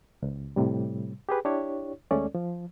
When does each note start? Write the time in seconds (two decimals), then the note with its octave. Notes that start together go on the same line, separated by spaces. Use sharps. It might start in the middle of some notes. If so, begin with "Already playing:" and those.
0.22 C#2
0.56 A2 C3 G3
1.29 G4 G#4 B4
1.45 D4 E4 G4 C#5
2.11 D#2 G#3 A3 C#4 A4 D5
2.35 F3